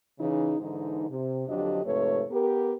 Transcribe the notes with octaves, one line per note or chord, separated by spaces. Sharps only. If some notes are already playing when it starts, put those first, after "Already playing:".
C#3 E3 D#4
G#2 D3 E3 D#4
C3
F2 D3 F#3 D4 G4 D#5
F2 G#2 C3 A3 B4 C#5
B3 G4 A#4